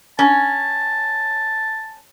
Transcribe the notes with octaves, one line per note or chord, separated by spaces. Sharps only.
C#4 A5